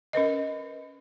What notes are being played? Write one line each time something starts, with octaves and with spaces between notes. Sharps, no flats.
C#4 A#4 B4 D#5